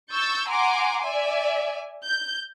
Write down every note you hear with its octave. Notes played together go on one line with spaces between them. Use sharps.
C#6 E6 G6 A6
F#5 G#5 A#5 C6 D6
D5 E5 G#5
G6